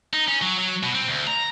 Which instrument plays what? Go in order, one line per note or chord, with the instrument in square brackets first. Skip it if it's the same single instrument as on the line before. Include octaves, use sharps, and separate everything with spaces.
[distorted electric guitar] D#4
C#4
F#3
F#3
B2
C4
D2
A#5